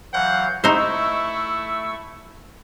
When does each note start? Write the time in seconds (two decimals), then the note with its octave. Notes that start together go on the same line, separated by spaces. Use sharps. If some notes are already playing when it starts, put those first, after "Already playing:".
0.13 E3 F#3 F5 F#5 G6
0.64 A3 D#4 E4 C5 C#6 E6